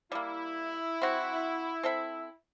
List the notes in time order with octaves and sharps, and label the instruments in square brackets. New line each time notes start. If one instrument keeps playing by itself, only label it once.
[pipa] G3 A#3 [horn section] E4
[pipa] C4 F#4
C4 A4 E5